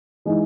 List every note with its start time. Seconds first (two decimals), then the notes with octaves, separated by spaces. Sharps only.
0.25 E3 G#3 D#4